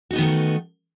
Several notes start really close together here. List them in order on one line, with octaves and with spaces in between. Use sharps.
F#4 D#4 B3 D#3 A3